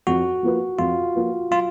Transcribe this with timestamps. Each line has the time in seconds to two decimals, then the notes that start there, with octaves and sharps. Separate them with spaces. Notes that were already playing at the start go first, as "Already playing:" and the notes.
0.07 F2 F#4
0.43 F3 A#3 F4 B4
0.79 F2 F4
1.15 F3 A#3 F4 B4
1.51 F#3 F4